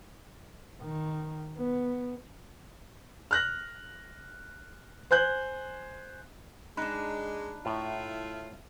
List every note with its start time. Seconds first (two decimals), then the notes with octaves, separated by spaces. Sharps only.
0.81 D#3
1.58 B3
3.31 F6 F#6 A#6
5.11 C5 G#5 F#6 G6
6.77 G#3 D4 D#4 A#5 B5 F#6
7.66 A2 A3 E4 F4